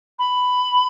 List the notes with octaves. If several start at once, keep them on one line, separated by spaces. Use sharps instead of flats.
B5